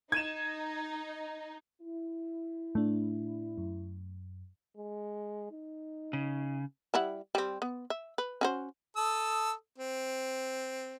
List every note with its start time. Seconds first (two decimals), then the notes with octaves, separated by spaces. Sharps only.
0.12 D#4 G#6 D#7 E7
1.81 E4
2.75 A2 A3 D4
3.58 F#2
4.77 G#3
5.51 D#4
6.13 C#3
6.94 G3 E4 F#5
7.35 G3 C4
7.62 B3
7.90 E5
8.18 B4
8.41 C#4 F#4 C5
8.96 A4 D#6 E6
9.78 C4